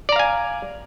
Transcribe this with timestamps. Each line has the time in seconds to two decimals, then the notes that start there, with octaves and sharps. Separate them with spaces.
0.09 D5
0.12 A#5
0.16 F5
0.19 G#5